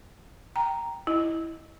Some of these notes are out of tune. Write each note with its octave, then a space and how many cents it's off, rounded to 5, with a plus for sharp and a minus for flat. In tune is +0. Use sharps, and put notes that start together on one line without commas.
G5 +0 A#5 +0
E4 -10 D#5 +0